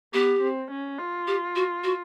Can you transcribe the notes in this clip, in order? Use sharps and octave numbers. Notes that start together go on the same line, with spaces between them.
B3 G4
C4
C#4
F4
G4
F#4
F#4